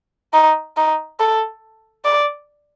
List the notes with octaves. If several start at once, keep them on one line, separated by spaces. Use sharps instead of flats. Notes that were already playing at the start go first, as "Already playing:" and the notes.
D#4
D#4
A4
D5